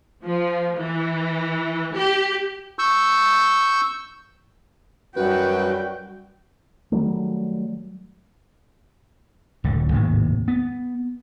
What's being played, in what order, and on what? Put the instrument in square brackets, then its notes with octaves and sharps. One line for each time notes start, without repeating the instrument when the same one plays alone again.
[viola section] F3
E3
G4
[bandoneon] C#6 E6 G6
[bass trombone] F#2 [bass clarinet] G3 [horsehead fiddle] F#4 G5 [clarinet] B4
[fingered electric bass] D#3 F#3 G3 A3
[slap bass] D1 C#2 D3
G#1 D#2 A2 C3
B3